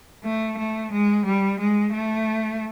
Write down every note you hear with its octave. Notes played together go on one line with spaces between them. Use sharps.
A3
A3
G#3
G3
G#3
A3